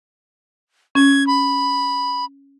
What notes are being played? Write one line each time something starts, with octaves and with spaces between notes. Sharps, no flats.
C#4 G#6
B5